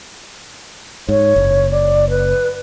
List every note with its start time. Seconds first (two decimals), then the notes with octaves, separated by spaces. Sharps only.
1.09 G#2 C#5
1.36 F#1
1.71 D5
2.10 B4